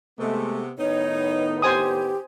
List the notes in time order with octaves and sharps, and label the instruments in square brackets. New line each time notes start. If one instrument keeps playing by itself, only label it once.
[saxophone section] C3 B3 [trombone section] G#3 A3
[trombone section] A2 D#3 B3 [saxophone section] D#4 [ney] C#5
[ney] G4 [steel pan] C5 G#5 D#6